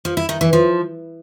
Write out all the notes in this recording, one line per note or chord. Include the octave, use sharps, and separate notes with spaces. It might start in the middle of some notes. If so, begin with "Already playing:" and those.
F3
E4
D#3
E3
F3